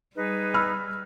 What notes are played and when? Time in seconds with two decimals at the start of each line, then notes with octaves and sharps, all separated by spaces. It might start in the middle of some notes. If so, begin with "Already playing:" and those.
0.16 G3 D#4 G#4 B4
0.54 B5 E6 F6